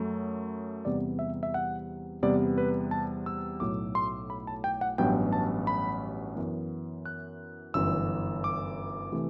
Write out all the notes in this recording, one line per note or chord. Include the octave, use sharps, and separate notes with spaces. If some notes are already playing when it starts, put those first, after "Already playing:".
Already playing: F#2 F#3 A3
E2 C3 G3 B3 D5
E5
E5
F#5
E2 C3 G3 B3 D5
B4
A5
E6
B1 A2 F#3 A3 D6
C6
B5
A5
G5
F#5
A1 G2 F#3 B3 G5
A5
B5
F#2 E3 B3
F#6
G1 F#2 E3 E6
D6
C3 E3 A3